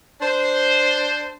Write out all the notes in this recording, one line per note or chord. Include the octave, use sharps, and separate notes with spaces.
D4 C5